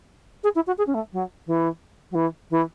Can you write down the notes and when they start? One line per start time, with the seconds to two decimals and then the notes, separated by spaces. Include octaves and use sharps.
0.44 G#4
0.55 E4
0.67 F#4
0.78 G#4
0.87 C#4
0.94 A3
1.13 F#3
1.47 E3
2.11 F#3
2.15 E3
2.51 E3